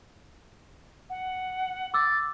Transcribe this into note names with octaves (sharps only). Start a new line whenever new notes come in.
F#5
D6 E6 A6